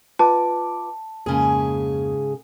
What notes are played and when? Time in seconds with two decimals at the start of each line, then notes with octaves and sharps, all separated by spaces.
0.19 F4 B4 A5 D6
1.26 F2 G#2 C#3 A#3 G#4